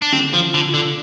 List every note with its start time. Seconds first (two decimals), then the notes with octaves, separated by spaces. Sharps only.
0.02 D4
0.12 D3 C4
0.33 F3
0.40 F4
0.54 D3
0.67 F4
0.74 D3